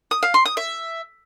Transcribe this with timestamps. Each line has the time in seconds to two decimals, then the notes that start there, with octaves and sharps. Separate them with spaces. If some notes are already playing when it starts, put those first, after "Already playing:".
0.11 D#6
0.23 F5
0.34 C6
0.46 D#6
0.57 E5